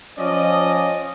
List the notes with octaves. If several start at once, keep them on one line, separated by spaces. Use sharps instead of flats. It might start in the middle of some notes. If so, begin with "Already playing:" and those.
F3 C#4 D5 D#5